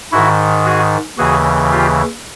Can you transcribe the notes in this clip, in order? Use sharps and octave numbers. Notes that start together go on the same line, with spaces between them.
G#2 D#3 E4 F#4
F#4 G#4
D#2 C#3 E3 F#4 G#4
F4 G4